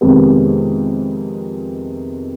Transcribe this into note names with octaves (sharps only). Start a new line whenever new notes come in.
F2 C3 D#3 G#3 B3